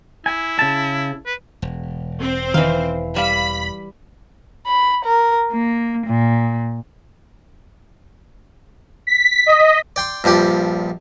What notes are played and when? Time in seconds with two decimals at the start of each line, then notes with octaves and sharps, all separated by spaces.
0.26 E4 G#5
0.59 C#3 A5
1.26 B4
1.62 E1
2.20 C4 C5
2.54 D#3 E3 F5
3.16 G3 F5 B5 B6 E7
4.66 B5
5.04 A#4
5.50 A#3
6.04 A#2
9.07 B6
9.46 D#5
9.96 D5 G5 C6
10.24 A#1 G2 F3 G4 D5